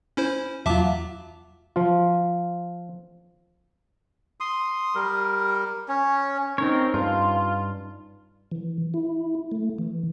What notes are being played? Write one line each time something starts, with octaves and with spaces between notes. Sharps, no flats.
C#4 E4 C5
E2 F#3 F4 E5 A5 D6
F3 F4
C6 D#6
G3 A#4
C#4
C4 C#4 D#4 A#4 C#5
G2 F4
E3
E4
A3
E3